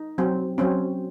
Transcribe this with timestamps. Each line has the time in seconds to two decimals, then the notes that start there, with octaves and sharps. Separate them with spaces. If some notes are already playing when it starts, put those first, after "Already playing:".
Already playing: D#4
0.18 F#3 C4
0.58 F#3 C4 C#4